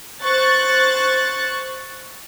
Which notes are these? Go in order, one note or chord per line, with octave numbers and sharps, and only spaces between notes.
C5 C#6 F#6 A6